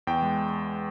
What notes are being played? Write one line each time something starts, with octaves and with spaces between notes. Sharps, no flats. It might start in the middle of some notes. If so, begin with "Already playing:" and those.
E2 G5
G#3